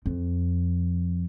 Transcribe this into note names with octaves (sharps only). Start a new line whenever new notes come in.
F2